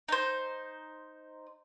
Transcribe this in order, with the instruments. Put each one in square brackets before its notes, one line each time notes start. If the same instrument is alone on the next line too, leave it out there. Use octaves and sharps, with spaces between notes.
[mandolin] D#4 C5